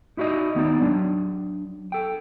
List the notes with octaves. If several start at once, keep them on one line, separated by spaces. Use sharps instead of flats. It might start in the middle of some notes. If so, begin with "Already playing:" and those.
D#4 E4 F#4 D5 D#5
D#2 B3 D#4 D5
F#3 D4
A4 G5